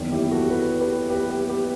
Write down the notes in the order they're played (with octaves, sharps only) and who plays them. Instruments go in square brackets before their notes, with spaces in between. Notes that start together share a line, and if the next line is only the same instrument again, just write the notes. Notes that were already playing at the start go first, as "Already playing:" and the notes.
Already playing: [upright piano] F#1 E2 D#3
E4 G4
F#4 A4
G4 B4
G4 B4
G4 B4
G4 B4
G4 B4